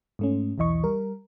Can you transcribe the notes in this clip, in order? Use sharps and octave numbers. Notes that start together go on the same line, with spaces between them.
G#2 A3 C#4
B1 E2 E3 D#5 C#6
G3 A#4